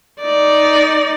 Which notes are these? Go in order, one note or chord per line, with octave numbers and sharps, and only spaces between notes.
D#4 D5